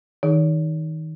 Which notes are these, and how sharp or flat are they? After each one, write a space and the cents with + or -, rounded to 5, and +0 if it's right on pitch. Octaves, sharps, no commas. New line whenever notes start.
D#3 +30 D#4 +0 G#4 +0